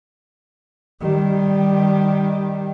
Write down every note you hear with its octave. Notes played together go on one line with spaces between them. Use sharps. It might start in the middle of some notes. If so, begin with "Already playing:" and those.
D#3 G3